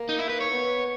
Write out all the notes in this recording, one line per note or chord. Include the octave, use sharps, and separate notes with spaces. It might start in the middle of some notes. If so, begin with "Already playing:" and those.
Already playing: A#3
D#4
E4
B4
C#5
B3